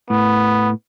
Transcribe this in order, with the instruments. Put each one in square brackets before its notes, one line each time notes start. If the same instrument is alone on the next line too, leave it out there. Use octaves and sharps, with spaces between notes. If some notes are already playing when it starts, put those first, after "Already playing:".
[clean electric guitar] A2 [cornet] B3